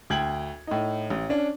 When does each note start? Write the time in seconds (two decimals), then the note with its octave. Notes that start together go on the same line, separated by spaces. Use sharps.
0.10 D2 G5 G#6 F#7
0.67 A2 D#4
1.10 A1
1.29 C#4 D4